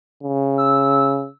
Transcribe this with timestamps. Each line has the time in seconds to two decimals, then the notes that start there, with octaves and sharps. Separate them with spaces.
0.23 C#3
0.58 E6